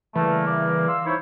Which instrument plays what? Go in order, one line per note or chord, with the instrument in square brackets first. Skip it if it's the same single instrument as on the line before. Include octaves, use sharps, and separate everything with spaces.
[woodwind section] C#3 G3 A#3 [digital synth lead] E3 [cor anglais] A3
[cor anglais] D5
[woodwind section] F5 C6 E6
[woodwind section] D#4 C5 C#5 [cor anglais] E4